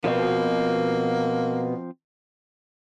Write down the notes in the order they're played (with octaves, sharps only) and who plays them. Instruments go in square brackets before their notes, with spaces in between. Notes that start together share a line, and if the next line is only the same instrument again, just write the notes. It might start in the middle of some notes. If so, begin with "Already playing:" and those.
[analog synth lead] B2 [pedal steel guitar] F3 C4 [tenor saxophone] A#3